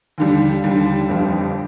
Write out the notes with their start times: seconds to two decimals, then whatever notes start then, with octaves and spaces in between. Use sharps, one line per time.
0.18 D#2 D3 G3
0.64 D#2 D3 G3
1.09 G1 F2 D3 G3